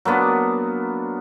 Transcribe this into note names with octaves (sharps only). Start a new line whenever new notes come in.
F#3 A#3 B3 D4